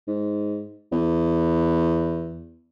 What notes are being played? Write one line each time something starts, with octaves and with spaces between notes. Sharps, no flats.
G#2
E2